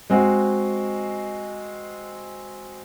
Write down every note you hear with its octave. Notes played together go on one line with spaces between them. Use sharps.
G#3 C4 F#4